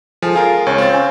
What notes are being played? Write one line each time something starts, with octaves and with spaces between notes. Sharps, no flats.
F3 G#3 A4
F4 G#4 A#4 C6
C#2 C#5 F5
C4 A6
C#4